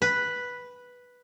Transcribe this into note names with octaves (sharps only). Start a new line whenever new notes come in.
B4